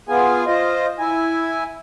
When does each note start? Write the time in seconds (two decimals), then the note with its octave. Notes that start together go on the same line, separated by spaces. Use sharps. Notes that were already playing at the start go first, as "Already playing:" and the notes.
0.09 B3 F4 G#4 G#5
0.47 F4 C5 D#5
0.99 E4 G#5